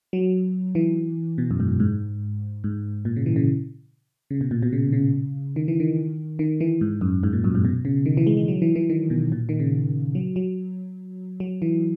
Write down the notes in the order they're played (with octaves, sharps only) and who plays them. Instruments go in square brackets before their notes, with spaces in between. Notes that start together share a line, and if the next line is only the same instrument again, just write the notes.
[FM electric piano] F#3
E3
B2
F#2
G#2
G#2
G#2
A#2
C#3
E3
C#3
C#3
B2
A#2
B2
C#3
C#3
D#3
E3
D#3
D#3
E3
G#2
F#2
G#2
A#2
F#2
G#2
B2
C#3
D#3
E3
G#3
G#3
F#3
E3
E3
D#3
B2
A#2
D#3
C#3
F#3
F#3
F#3
E3